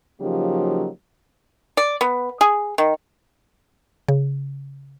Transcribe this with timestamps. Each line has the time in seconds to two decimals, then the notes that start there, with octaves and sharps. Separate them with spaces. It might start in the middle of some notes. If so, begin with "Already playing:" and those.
0.21 C#3 F3 F#3 A#3 D#4 G4
1.77 D5
2.01 B3
2.41 G#4
2.78 D#3
4.08 C#3